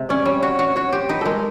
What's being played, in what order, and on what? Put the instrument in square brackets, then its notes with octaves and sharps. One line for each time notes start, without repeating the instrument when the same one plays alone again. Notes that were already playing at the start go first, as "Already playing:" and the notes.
Already playing: [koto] C3 G#3
[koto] C#4 [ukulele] D5
[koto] G3 [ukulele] C#5
[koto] F#4 [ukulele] C#5
[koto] F#4 [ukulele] C#5
[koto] F#4 [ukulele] C#5
[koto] G4 [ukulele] C5
[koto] D#4 [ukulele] B4
[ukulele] A4
[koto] G#3 [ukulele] A#4